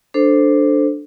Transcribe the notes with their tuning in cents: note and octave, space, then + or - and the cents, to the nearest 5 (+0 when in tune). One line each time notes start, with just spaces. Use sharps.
D4 +5 A4 +0 C5 +0